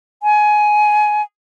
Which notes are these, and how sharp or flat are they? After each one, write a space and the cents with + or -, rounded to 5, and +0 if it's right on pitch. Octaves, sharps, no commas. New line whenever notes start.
G#5 +20